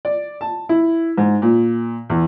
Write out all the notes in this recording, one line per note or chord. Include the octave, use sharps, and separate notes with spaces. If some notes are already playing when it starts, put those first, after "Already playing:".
D5
A5
E4
G#2
A#2
E2